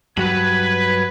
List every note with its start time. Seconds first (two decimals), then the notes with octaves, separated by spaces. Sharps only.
0.18 G2 F#3 B4 B5 G#6